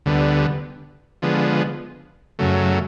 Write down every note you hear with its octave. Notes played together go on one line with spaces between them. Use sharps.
D2 D3 G3 B3
D3 F3 G#3 B3
F#2 C#3 F#3 A3